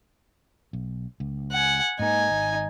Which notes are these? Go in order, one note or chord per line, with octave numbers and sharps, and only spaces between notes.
B1
C#2
F#5 G#5
G#2 A#3 D#4 G#5
G#1